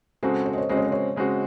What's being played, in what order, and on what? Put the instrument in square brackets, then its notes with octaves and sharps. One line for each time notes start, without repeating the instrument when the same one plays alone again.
[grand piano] C#3 G#3 C4 F#4 [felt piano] A4
[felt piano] C5
D#5
C#5
[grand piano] C#3 G#3 C4 F#4 [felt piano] D#5
[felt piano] C#5
C5
C#5
[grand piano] C#3 G#3 C4 F#4